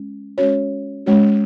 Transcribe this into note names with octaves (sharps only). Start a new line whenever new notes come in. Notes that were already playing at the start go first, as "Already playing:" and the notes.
Already playing: G#3 C#4
G#3 C#4 F#4 C#5
G#3 C#4 F#4 C#5